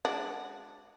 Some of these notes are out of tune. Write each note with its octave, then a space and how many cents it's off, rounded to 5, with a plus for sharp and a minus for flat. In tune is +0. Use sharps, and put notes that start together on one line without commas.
G#3 +0 D4 +0 F#4 +0